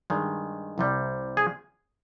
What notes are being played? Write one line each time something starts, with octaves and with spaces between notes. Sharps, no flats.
G2 D#3 G#3
C2 C3 G3
G#4